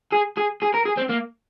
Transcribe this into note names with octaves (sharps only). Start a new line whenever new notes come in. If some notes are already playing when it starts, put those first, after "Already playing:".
G#4
G#4
G#4
A#4
G#4
C4
A#3